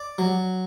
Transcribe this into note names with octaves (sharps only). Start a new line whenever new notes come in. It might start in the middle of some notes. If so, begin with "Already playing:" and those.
Already playing: D5
F#3